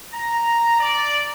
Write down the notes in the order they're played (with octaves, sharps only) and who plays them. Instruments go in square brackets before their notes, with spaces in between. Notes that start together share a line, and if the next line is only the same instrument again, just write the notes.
[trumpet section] A#5
D5